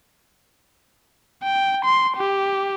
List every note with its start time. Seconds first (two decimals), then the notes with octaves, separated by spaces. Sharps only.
1.43 G5
1.85 C6
2.17 G4